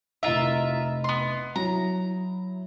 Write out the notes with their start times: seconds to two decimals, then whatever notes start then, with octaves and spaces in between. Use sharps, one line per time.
0.23 F1 E4 F4 A#4 D#5 E5
1.04 B3 C6
1.56 F#3 E4 A#5